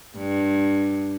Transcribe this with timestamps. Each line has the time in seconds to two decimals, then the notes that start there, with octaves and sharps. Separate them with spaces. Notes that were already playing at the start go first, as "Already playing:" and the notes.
0.18 G2